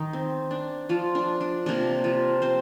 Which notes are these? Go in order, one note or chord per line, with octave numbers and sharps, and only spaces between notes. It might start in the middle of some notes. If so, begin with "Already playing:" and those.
Already playing: D#3 D#4
C4
D4
F3 F4
D4
D4
C3 F3 A#3 D4
F3 F4
C4 C5